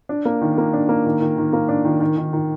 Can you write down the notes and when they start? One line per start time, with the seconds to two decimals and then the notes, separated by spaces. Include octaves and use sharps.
0.09 D4
0.25 A#3
0.41 D#3
0.58 A#3
0.73 D4
0.89 A#3
1.05 D#3
1.21 D#3
1.38 D#3
1.53 A#3
1.69 D4
1.85 D#3
2.01 D#3
2.17 D#3
2.33 D#3